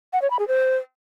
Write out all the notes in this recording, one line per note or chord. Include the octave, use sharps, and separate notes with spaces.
F#5
C#5
B5
G#4
C5